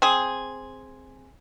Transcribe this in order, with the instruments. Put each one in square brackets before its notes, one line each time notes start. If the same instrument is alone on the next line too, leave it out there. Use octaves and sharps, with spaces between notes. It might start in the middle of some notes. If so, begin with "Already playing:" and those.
[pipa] C4 G#4